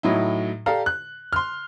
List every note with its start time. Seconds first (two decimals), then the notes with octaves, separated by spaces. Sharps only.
0.03 A2 F#3 D#4 E4
0.66 G4 A4 D5 F5 A#5
0.86 F#6
1.33 C6 F6